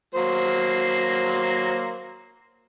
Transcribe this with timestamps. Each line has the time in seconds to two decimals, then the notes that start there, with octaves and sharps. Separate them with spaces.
0.15 F#3 A#3 C5